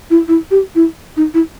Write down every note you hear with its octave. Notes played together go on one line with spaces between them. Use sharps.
E4
E4
G4
E4
D#4
E4